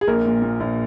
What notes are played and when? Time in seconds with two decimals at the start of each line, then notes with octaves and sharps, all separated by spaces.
0.01 G#4
0.07 A#1 A#4
0.25 A#2
0.42 A#2
0.60 A#1